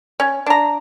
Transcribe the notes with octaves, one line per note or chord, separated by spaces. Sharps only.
C#4
D4 A#5